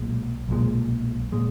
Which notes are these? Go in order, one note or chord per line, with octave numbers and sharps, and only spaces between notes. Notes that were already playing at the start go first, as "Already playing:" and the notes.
Already playing: B1 A#2 G#3
B1 A#2 G#3
A#2 G#3